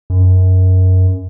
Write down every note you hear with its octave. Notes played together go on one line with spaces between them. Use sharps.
F#2